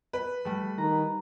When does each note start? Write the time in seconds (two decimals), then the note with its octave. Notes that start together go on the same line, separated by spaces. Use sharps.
0.13 B4
0.45 G3 A3
0.78 D#3 A#5